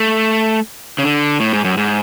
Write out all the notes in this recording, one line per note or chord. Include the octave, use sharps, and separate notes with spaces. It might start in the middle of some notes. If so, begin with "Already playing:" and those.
Already playing: A3
C#3
D3
A2
G#2
F#2
G#2